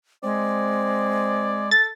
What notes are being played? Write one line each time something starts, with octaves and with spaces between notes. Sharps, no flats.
G#3 C4 D5
A4 A6